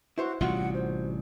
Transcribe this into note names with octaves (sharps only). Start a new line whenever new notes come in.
E4 F#4 C5 C#5
A1 C3 G3 F4 F#4 F#5
C5